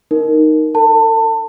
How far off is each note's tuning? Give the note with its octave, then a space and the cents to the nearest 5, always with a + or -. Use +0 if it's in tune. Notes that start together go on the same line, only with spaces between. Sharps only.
D#4 +0 A#4 -5
A4 +40 A5 +25